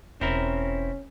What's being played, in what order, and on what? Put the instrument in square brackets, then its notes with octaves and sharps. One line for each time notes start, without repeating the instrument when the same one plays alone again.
[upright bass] E1 [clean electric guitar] C4 E4 A#4 [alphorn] C#4